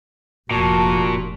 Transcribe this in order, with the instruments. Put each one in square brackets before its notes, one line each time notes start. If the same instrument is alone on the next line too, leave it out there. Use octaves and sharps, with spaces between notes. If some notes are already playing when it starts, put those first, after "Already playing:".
[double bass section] F1 [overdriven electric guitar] A#2 [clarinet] F#4 [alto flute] A5